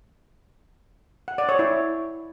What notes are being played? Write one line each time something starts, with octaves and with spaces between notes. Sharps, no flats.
F#5
D5
C#5
E4